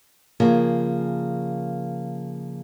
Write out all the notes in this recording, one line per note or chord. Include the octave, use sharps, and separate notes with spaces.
C#3 F3 A#3 G#4 A#4